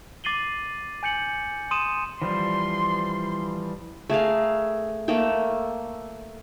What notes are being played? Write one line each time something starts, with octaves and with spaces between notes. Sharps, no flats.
D6 A6 C7 D#7 F#7 G7
G#5 G6 C#7 F#7
C6 D#6 D#7 E7
E3 F3 G3 C6
A3 G#4 A#4 F5
A3 A#3 A4 G5